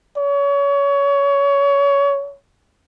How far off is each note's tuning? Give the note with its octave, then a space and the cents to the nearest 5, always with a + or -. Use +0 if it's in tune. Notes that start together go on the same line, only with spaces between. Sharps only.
C#5 +25